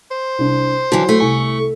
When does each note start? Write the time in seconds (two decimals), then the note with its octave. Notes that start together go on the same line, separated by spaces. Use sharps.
0.11 C5
0.38 C2 D4
0.92 D3 E3 F#3
1.09 A3
1.20 C2 G#5 C#6